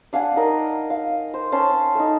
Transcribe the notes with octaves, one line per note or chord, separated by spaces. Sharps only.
D4 F5 F#5 G#5
D#4 A#4 D#5
F5
C5
C#4 A5 C6
A3 D#4